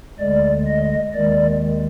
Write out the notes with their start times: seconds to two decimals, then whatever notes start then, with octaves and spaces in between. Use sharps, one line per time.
0.19 D2 D3 G#3 D5
0.66 D#5
1.14 D#2 D#3 G#3 D5